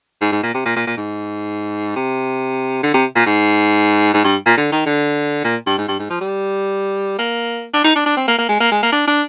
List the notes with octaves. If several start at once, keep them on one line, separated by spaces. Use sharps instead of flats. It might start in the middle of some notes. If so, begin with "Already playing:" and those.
G#2
G#2
A#2
C3
A#2
A#2
A#2
G#2
C3
D3
C3
A#2
G#2
G#2
G2
A#2
D3
D#3
D3
A#2
G2
G#2
G2
G#2
F3
G3
A#3
D4
D#4
D4
D4
C4
A#3
A#3
G#3
A#3
G#3
A#3
D4
D4